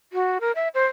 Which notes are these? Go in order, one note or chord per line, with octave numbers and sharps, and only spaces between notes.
F#4
A#4
E5
C5